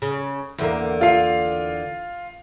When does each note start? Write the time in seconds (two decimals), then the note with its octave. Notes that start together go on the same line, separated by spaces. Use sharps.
0.02 C#3
0.58 E2 D3 A#3
1.01 F4 F5